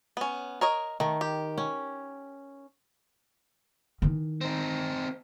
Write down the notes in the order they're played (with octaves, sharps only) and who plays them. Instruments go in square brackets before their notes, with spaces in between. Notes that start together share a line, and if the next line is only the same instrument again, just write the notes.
[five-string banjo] B3 C#4
A#4 C#5 D#5
[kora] D#3 [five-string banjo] A3
[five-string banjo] G4
[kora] C#4
[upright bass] D#3 E3
[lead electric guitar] C4 D#4